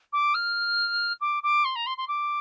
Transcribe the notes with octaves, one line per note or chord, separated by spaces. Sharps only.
D6
F6
D6
D6
C6
A#5
C6
C6
D6